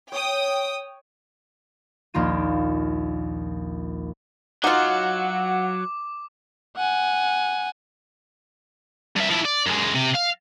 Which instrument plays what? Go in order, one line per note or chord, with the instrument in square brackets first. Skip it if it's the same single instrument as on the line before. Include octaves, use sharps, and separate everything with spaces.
[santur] C#5 [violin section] G5 D#6
[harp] A#1 D#2 A#3 F4 D#7
[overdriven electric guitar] F#3 [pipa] D#4 F4 [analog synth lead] F#5 [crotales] D6
[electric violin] F#5 G#5
[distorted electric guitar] G2 E5
F3 E4
D5
F#2 G#3
C3
F5